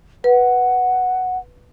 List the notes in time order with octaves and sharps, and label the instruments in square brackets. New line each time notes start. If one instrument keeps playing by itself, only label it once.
[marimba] B4 [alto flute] F#5